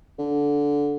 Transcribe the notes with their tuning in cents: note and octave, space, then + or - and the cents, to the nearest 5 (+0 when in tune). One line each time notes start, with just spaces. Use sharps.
D3 -15